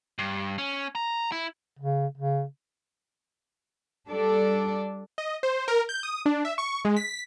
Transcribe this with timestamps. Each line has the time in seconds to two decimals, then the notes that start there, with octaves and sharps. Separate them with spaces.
0.19 G2
0.58 C#4
0.95 A#5
1.32 E4
1.79 C#3
2.18 C#3
4.10 G3 D4 A4 D5
5.18 D#5
5.43 C5
5.68 A#4
5.89 G6
6.03 D#6
6.26 D4
6.45 E5
6.58 C#6
6.85 G#3
6.97 B6